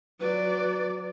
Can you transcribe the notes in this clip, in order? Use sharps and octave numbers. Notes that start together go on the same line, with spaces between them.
F#3 B4 D5